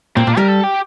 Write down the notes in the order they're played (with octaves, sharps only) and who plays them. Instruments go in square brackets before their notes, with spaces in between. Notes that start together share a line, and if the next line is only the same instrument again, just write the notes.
[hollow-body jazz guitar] A#2 [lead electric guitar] C4
[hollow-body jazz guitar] A#2 [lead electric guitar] D4
[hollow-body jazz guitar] G3 [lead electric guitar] A#4
[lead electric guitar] A4
G4